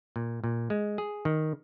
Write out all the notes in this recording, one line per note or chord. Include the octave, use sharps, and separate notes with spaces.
A#2
A#2
G#3
G#4
D#3